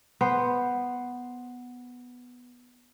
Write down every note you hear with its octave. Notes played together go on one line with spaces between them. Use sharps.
B3 C5